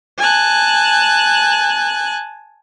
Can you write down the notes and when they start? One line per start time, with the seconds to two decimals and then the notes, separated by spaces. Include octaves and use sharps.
0.19 G#5 A5 F#6